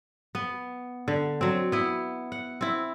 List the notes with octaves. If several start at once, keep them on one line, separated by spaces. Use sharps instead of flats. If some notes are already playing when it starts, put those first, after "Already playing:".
B3
D3
F#3 C4
B3 E4
F#5
C4 E4